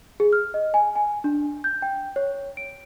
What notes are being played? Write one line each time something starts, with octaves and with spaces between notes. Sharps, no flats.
G#4
F6
D#5
G#5
G#5
D4
G6
G5
C#5
D7